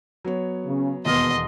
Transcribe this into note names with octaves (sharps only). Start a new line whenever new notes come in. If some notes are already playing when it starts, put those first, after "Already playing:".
F#3 B3 C#5
C#3 C#4
E1 D#2 B2 B3 D#5 C6 F6